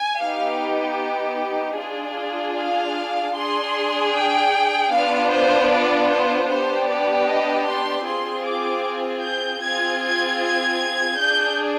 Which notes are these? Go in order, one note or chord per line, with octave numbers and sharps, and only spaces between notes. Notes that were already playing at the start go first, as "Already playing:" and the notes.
Already playing: G#5
B3 D#4 G4 F5
D4 F4 G#4
F5
D4 G#4 C6
G5
B3 D4 F4 F5
C5
D5
C5
B3 D4 G4 C5
D5
D#5
C6
C4 F4 G#4 C6
D6
G6
C4 F4 G#4 G#6
G#6
G#6
D4 G#4 G6